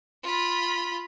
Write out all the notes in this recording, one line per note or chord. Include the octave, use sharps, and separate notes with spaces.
F4 B5